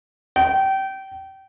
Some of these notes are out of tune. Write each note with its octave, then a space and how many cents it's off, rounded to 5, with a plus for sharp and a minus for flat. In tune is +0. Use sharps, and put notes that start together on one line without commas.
G5 -25